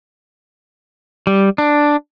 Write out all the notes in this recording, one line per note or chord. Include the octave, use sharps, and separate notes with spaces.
G3
D4